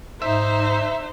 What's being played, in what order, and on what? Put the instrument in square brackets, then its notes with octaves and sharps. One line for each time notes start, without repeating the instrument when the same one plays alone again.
[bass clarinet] G#2 [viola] D#4 C5 [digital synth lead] E5